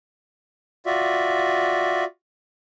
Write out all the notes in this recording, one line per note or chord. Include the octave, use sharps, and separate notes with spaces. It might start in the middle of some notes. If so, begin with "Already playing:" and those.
F4 F#4 D5 E5